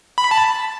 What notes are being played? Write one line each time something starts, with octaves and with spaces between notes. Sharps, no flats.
B5
A5